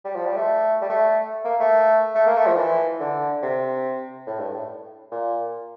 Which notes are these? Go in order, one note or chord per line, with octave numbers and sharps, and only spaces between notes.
G3
F3
G3
A3
G3
A3
A#3
A3
A3
A#3
A3
F3
E3
D3
C3
A2
G2
A2
A#2